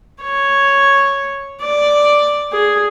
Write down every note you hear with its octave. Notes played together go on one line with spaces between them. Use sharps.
C#5
D5
G#4